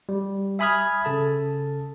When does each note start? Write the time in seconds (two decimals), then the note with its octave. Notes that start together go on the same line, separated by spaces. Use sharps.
0.09 G3
0.59 E5 G#5 B5 D#6 F6 G#6
1.05 C#3 A4 A5